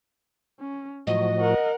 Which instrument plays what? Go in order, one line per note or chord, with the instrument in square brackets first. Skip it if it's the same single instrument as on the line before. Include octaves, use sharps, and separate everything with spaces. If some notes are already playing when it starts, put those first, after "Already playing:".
[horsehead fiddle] C#4
[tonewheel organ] A2 F3 F#4 [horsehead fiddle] F#3 [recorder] D#5
[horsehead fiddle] A#4 F#5